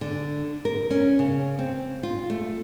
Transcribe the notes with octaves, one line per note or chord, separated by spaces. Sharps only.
D3
A#4
C#4
C#3
C4
F4
A3